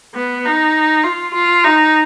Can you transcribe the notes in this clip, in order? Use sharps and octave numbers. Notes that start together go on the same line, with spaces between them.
B3
D#4
F4
F4
D#4